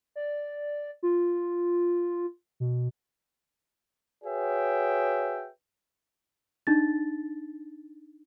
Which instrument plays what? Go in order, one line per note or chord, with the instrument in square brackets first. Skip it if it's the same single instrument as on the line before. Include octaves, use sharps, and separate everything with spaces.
[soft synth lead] D5
F4
B2
[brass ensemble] F#4 G#4 B4 C#5 E5 G5
[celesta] D4 D#4 A6